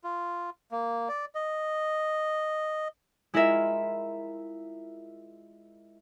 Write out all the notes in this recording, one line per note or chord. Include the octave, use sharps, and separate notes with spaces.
F4
A#3
D5
D#5
G#3 E4 F4 A#4 E5